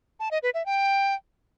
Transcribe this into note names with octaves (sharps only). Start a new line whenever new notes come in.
A5
D#5
B4
E5
G5